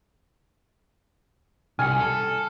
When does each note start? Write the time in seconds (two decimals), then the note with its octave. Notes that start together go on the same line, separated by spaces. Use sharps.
1.79 C2 G#5 F6 C#7
2.00 A4